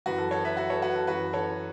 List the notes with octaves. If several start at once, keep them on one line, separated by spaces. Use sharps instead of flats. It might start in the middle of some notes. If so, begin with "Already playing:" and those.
F#2 E3 F#4 B4
A4
A4 C#5
B4 E5
F#4 B4
A4 C#5
F#4 B4
A4
F#2 E3 F#4 B4
A4 C#5